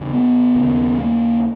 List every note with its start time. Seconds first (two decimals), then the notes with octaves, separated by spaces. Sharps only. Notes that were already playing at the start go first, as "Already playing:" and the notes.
Already playing: E2 C#3
0.13 B3
0.56 D#2 C#3
0.99 A#3